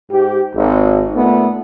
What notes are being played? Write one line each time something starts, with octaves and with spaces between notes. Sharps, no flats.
G#2 G4
G#1
A#2 A3 B3